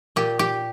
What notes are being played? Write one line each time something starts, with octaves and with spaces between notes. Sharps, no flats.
A#2 G4
G4